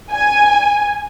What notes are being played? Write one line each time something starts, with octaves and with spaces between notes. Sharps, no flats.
G#5